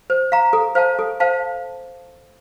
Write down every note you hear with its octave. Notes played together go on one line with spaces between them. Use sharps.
C5
F5 A#5
A4
C5 F5 A5
A4
C5 F5 A5